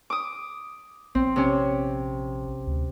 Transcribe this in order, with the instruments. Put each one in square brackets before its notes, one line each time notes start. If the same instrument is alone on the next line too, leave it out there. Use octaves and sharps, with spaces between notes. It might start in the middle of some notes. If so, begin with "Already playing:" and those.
[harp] D6 D#6
[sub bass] A#1 [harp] C4
[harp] C3 C#4
[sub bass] D2